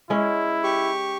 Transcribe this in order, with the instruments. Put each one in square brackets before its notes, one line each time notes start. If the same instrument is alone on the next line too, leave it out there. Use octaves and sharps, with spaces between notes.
[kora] G#3 C#4 [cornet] E4
[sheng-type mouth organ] G4 C#6